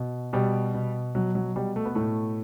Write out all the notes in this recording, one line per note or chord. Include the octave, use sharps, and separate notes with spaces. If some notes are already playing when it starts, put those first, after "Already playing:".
Already playing: B2
B2 G3
B2
B2 F#3
F#3
B2 G3
A3
B3
A2 A3